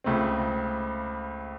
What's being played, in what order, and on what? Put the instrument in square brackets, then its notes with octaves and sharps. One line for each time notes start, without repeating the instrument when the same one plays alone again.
[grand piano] C#2 C#3 A3 C4